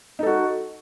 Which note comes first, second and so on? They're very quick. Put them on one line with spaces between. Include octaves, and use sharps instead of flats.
D#4 A4 F#4